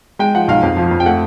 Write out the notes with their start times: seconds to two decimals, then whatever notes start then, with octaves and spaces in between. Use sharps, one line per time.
0.19 G#3 G5
0.34 F3 F#5
0.48 B1 F5
0.62 F2
0.77 F3
0.91 F2
1.00 G5
1.06 A3 F#5